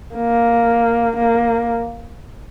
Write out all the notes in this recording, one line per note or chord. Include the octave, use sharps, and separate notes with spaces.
A#3
A#3